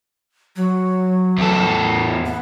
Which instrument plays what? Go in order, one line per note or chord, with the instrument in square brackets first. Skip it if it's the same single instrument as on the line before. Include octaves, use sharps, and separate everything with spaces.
[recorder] F#3
[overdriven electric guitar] E2 A4
[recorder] B3